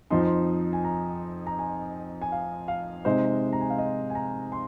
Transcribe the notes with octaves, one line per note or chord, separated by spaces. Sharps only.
F2 F3 C4 D#4 C6
A#5
C6
G#5
A#5
A#5
G#5
G#5
F5
F5
C3 G#3 D#4 C5
A#5
G#5
F5
D#5
G#5
A#5
C6